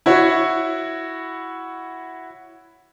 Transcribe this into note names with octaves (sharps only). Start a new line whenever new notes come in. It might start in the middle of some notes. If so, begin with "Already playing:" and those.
E4 F#4 C#5